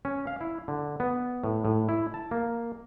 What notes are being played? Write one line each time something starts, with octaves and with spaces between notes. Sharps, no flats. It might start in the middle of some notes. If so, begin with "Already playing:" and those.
C#4
F5
E4
D3
B3
A2
A2
E4
A5
A#3